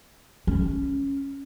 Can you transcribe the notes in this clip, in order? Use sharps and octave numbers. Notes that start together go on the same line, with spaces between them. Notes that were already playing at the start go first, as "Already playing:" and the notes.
C#4